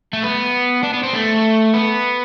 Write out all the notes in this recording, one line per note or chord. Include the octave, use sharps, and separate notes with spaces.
A3
B3
D4
B3
C4
A3
B3